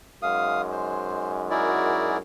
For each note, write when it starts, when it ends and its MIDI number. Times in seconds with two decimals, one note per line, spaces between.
0.22 2.22 42
0.22 2.22 56
0.22 2.22 63
0.22 0.61 77
0.22 0.61 87
0.72 1.32 72
1.51 2.17 64
1.51 2.18 66
1.51 2.18 68
1.51 2.18 70
1.51 2.17 74